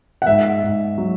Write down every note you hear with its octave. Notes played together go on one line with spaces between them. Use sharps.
F#5
G#2 E5
G#2
F#3